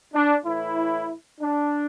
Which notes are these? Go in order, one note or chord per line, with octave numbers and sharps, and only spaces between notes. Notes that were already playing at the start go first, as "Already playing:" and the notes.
D4
A2 E3 E4
D4